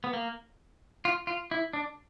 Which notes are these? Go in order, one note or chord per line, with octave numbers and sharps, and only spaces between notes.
B3
A#3
F4
F4
E4
D4